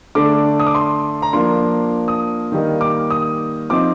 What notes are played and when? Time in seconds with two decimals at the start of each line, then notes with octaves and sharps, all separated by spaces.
0.15 D3 A3 D4 D6
0.60 D#6
0.67 D6
0.75 C6
1.22 A#5
1.33 F3 A#3 D4 C6
2.08 D#6
2.52 D#3 G3 A#3 D#4
2.81 D6
3.10 D#6
3.70 F3 C4 D#4 D6